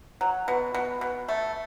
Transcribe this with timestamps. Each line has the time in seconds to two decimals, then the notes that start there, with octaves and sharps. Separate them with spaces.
0.21 F#3
0.48 B2
0.74 B2
1.01 B2
1.28 A3